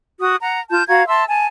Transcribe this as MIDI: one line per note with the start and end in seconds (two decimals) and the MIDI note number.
0.19 0.36 66
0.19 0.36 87
0.42 0.60 78
0.42 0.60 82
0.70 0.83 65
0.70 0.83 81
0.70 0.83 91
0.88 1.05 66
0.88 1.05 77
0.88 1.05 82
0.88 1.05 92
1.07 1.24 76
1.07 1.24 81
1.07 1.24 84
1.07 1.24 88
1.27 1.47 80
1.27 1.47 81